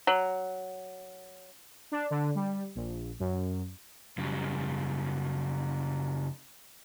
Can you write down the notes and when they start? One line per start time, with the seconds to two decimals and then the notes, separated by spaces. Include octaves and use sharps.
0.07 F#3
1.92 D4
2.10 D3
2.35 G3
2.75 A#1
3.20 F#2
4.18 F#2 C#3 F#3 G3